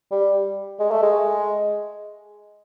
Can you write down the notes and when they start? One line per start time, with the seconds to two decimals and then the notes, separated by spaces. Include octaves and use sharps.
0.11 G3
0.79 G#3
0.91 A3
1.02 G#3